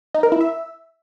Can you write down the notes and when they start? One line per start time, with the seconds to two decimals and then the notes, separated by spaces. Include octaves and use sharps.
0.14 D#4
0.23 A#4
0.32 E4
0.41 E5